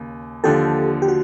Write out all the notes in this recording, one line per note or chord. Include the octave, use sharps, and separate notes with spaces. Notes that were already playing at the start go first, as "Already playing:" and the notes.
Already playing: D#2 C#3
D#2 D3 F3 G4 A4
G4
F#4